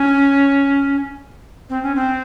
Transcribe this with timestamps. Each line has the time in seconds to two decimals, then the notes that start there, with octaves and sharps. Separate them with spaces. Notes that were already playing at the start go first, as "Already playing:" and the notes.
Already playing: C#4
1.70 C4
1.83 C#4
1.95 C4